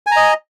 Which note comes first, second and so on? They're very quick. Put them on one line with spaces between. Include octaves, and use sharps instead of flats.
G#5 A#5 D#5